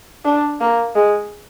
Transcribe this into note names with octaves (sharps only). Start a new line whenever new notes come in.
D4
A#3
G#3